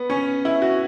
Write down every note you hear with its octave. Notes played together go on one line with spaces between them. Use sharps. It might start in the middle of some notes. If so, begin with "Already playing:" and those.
Already playing: B3
C#4
E4
F#4